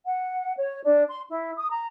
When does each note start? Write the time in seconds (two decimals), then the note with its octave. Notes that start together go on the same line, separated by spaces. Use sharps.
0.04 F#5
0.56 C#5
0.83 D4
1.07 C6
1.27 E4
1.56 D#6
1.69 A#5